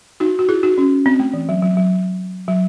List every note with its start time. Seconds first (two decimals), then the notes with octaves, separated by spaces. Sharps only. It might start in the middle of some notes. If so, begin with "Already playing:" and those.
0.20 D#4 F#4
0.39 F#4
0.49 E4 G#4
0.63 D#4 F#4
0.78 C#4
1.06 C4
1.20 A3
1.34 E3
1.49 F#3
1.62 F#3
1.77 F#3
2.48 F#3